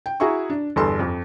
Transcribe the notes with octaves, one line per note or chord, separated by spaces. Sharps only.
G5
E4 F#4 G#4 E5 A#5 C#6
D4
G1 E2 A4 C6
F2